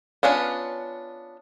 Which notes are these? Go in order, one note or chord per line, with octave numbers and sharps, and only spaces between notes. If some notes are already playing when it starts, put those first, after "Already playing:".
B3 C#4 D4 F4